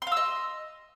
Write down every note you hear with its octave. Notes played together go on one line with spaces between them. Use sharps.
D#5 F5 C6 E6